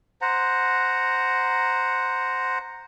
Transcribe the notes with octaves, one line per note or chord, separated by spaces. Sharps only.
C5 F#5 A#5